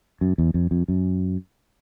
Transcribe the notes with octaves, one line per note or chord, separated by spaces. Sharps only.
F#2
E2
F2
F2
F#2